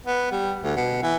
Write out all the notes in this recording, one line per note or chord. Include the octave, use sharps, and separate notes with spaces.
B3
G3
D2
B2
E3